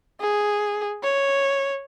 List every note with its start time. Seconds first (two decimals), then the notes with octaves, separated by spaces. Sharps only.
0.20 G#4
1.03 C#5